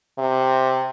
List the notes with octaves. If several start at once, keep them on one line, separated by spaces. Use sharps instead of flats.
C3